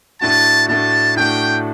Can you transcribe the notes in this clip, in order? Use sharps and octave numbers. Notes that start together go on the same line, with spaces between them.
A2 A3 D4 F#4 A5
A2 A3 D4 F#4 A5
A2 A3 D4 F#4 G5